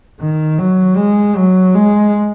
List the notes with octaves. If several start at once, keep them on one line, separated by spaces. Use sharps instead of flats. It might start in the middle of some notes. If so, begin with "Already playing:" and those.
D#3
F#3
G#3
F#3
G#3